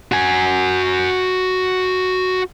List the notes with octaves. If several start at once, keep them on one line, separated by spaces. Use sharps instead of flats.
F#4 G#5